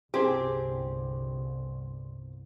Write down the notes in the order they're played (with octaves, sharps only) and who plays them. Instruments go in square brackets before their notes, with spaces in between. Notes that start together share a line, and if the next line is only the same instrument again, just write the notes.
[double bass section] G1 C2 [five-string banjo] C4 G#4 [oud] G4 [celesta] C6